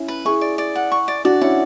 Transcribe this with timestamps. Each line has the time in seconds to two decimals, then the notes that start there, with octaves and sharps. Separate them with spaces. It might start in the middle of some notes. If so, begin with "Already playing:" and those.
Already playing: C#4 E4
0.08 B4
0.25 E4 G#4 C#6
0.41 D5
0.58 D5
0.75 F#5
0.92 C#6
1.08 D5
1.25 D4 F#4 D5
1.41 C#4 E4 F#5